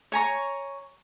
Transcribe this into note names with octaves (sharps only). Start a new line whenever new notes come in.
C#5 G#5 A#5 C#6